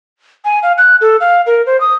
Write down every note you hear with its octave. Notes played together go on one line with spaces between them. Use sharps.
G#5
F5
F#6
A4
F5
A#4
C5
D#6